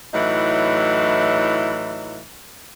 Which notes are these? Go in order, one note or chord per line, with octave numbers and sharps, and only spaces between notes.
A2 E3 F#3 D#4